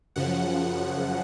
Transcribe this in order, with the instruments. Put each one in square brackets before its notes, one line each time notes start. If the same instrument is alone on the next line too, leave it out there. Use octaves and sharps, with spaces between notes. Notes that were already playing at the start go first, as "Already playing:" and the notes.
[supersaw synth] F#2 C#3 F3 F#5